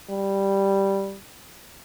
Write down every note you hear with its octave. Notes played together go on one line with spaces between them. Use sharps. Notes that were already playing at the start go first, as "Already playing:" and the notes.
G3